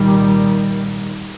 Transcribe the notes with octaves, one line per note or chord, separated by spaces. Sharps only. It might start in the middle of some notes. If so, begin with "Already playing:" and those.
Already playing: C2 A#2 D#3 G3